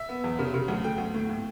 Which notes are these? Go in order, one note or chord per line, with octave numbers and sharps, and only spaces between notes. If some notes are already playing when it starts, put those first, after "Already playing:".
Already playing: E5
B3
E2
C#3
C#3
D2
A3 G5
D2
A2
A2